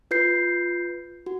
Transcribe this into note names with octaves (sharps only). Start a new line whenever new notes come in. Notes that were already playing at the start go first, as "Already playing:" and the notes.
F4 B4 G6 C7
F#4